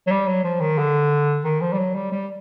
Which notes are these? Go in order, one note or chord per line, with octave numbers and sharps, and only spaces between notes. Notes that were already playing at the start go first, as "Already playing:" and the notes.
F#3
G3
F#3
F3
D#3
D3
D#3
F3
G3
F#3
G3
G3